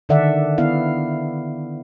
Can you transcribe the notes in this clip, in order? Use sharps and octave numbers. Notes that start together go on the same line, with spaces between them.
D3 D#3 A4 D5 E5 F#5
B3 E4 F5